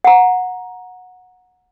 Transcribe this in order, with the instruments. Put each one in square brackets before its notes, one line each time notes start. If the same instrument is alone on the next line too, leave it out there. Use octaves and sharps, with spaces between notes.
[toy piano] F#5 A#5